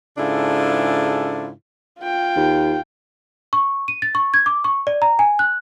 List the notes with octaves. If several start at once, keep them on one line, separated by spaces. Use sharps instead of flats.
G#2 C#3 D4 E4 F4 A4
F4 G5
D#2
C#6
D#7
A6
C#6
G#6
D6
C#6
D5
A#5
G#5
F#6